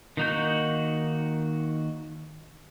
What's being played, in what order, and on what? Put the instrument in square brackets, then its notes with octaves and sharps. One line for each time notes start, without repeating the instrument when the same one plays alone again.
[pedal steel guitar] D#3 A#3 D#4 F#4 G6